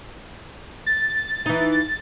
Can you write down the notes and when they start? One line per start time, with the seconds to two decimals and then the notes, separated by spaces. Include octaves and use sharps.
0.86 A6
1.46 E3 D#4